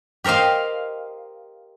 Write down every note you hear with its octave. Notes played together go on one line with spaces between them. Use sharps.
G4 A#4 C5 D#5 F5